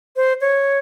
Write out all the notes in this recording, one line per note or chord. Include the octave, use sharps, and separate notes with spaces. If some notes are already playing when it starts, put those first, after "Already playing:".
C5
C#5